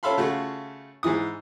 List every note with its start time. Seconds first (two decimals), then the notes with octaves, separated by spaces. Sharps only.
0.03 C#4 A4 E5 F5 B5 C6
0.17 C#3 A3 F4 F#4
1.03 G#2 E3 E4 D#6